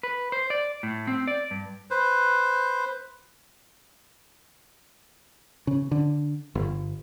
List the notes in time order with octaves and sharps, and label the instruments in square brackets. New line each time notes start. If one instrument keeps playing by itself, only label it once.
[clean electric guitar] B4
C5
D5
A2
C4
D5
G2
[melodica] B4 C5
[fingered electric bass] C#3
D3
G1